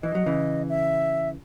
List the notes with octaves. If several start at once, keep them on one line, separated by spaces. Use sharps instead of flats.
E3 D#5
F#3
C#3 E3
E5